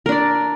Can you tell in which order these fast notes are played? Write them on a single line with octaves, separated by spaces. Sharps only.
A#4 D4 D5